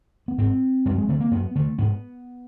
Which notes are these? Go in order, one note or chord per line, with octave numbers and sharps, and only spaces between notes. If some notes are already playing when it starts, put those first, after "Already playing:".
B3
G#2 C4
F#2 G3
G#3
D3 A3
A#3
F#2 B3
D3 A3
G#2 B3